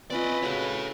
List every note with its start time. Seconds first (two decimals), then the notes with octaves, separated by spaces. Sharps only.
0.10 C4 C#4 F4 B4 D5 D#5
0.42 C#3 F#4 A4 C#5